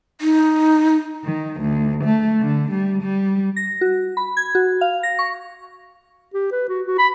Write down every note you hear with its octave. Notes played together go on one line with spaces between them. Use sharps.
D#4
D#3
D2
A3
D3
G3
G3
A#6
F#4
B5
G#6
F#4
F5
A#6
C#6
G4
B4
F#4
F#4
B5